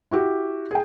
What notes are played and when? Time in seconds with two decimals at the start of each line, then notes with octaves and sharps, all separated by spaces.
0.11 E4 F#4 G4
0.71 G#4 G5